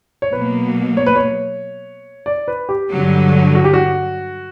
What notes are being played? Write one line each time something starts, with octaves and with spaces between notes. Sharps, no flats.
C#5
B2 F#3 A#3 B4
C#5
B4
C#5
D5
B4
G4
G2 D3 F#3
F#4
G4
F#4